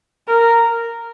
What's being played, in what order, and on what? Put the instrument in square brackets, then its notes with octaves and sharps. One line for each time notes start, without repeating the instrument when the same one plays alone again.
[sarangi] A#4